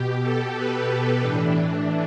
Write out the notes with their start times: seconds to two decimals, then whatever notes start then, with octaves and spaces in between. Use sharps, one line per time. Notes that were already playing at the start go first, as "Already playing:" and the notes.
Already playing: B2 G4
0.22 A4
0.56 B4
1.20 A2 E3 D4